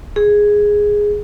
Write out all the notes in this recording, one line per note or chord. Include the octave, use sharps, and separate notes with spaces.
G#4